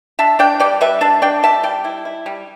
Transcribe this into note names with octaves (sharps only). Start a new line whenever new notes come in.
D4 E5 A5
D4 D5 G5
G3 D5 G5
G3 B4 E5
D4 E5 A5
D4 D5 G5
G3 E5 A5
G3 D5 G5
E4
E4
G3